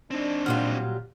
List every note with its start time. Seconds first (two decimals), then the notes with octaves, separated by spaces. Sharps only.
0.11 C4 D4 D#4
0.46 A#2 F#3 G3 F4 F6